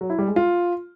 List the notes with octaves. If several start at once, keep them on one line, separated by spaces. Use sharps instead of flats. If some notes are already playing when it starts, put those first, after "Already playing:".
F#3
E4
G3
G#3
F4